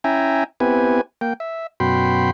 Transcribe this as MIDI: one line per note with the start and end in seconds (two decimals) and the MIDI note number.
0.04 0.44 61
0.04 0.44 64
0.04 0.44 76
0.04 0.44 79
0.04 0.44 80
0.04 0.44 82
0.60 1.01 59
0.60 1.01 60
0.60 1.01 64
0.60 1.01 67
0.60 1.01 71
0.60 1.01 80
1.21 1.33 58
1.21 1.33 79
1.40 1.67 76
1.80 2.31 42
1.80 2.31 47
1.80 2.31 66
1.80 2.31 79
1.80 2.31 83
1.80 2.31 84